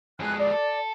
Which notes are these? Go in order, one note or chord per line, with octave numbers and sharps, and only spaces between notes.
F2 G#3 G#5 F#6
D5
A4